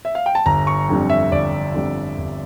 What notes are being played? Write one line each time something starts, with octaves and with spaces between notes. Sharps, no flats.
E5
F5
G5
A5
G1 A#5
C#6
F2 D3 G3
E5
G1 D5
F2 D3 G3
G1